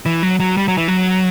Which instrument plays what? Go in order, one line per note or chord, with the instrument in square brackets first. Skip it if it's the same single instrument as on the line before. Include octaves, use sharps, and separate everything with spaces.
[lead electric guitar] E3
F#3
F#3
G3
F#3
E3
F#3